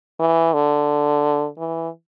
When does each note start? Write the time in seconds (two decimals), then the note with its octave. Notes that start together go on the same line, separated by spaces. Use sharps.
0.20 E3
0.53 D3
1.58 E3